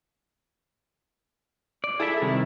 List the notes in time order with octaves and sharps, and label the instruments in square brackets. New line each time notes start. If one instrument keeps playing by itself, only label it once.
[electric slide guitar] D5
[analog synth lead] E4 [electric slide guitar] G#4 A4 E5
[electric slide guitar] C3 D#3 G3